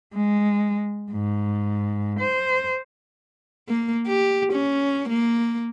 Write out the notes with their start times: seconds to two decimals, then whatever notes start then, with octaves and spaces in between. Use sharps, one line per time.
0.14 G#3
1.12 G#2
2.19 C5
3.69 A#3
4.07 G4
4.53 C#4
5.09 A#3